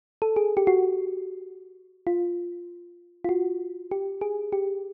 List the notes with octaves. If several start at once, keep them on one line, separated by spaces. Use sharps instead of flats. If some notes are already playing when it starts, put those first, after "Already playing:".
A4
G#4
G4
F#4
F4
F4
F#4
G4
G#4
G4